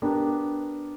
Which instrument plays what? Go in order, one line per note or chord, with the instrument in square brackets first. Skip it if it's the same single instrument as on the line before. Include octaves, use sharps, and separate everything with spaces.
[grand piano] B3 D4 G4 A#4